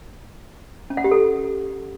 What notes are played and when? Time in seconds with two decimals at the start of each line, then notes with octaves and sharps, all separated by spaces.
0.90 C#4
0.97 F#5
1.04 G4
1.11 A4